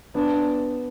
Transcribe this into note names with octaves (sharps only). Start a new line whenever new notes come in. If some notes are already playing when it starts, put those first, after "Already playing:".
B3 D4